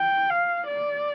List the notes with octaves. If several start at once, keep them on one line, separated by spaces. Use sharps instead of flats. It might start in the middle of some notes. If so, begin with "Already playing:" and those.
Already playing: G5
F5
D5